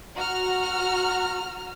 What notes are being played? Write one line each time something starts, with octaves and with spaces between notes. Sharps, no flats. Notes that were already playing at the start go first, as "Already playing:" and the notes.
F#4 A#5 F6